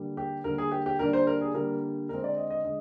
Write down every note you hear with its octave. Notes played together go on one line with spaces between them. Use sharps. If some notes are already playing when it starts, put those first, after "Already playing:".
Already playing: D3 G3 A#3
G4
D3 G3 A#3 A#4
G#4
G4
G4
D3 G3 A#3 D4 A#4
C5
A#4
G#4
D3 G3 A#3 D4 A#4
D3 G#3 C4 A#4
D5
D#5
D#5
D3 G#3 D#5